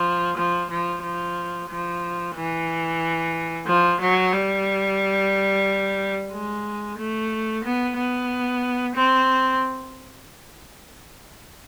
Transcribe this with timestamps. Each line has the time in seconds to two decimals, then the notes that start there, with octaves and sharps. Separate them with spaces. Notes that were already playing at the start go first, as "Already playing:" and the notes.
Already playing: F3
0.37 F3
0.70 F3
1.03 F3
1.70 F3
2.35 E3
3.67 F3
4.01 F#3
4.33 G3
6.32 G#3
6.98 A3
7.64 B3
7.97 B3
8.96 C4